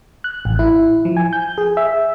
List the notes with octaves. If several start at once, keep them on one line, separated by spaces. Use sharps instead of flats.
F#6
A1
E4
F3
G#5
G6
G#4
E5